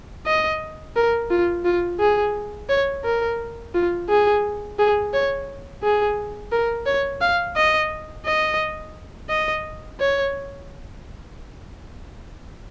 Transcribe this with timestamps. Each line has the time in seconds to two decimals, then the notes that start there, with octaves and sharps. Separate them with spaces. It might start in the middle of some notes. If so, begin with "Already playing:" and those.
0.26 D#5
0.96 A#4
1.31 F4
1.65 F4
2.00 G#4
2.69 C#5
3.04 A#4
3.75 F4
4.09 G#4
4.79 G#4
5.13 C#5
5.83 G#4
6.52 A#4
6.86 C#5
7.21 F5
7.56 D#5
8.26 D#5
9.29 D#5
10.00 C#5